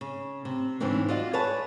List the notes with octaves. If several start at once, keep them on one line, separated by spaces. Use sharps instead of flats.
C#3
C3
D2 G#2 C#3 E3 C4 D4
F4 F#4 D5 D#5 F#5
G#4 B4 C#5 D5 F#5 A5